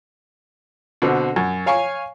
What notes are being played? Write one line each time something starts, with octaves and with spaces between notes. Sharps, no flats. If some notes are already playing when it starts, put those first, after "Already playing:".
B2 D3 C4
F#2
C#5 F5 G#5 C#6